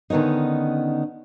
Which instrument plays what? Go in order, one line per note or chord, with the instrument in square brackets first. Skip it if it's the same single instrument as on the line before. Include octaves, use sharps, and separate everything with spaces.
[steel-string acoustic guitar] D3 D#3 B3 C#4 D#4